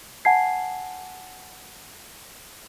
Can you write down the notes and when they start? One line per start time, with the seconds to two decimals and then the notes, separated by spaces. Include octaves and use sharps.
0.25 F#5 G#5 A5 G#6 C7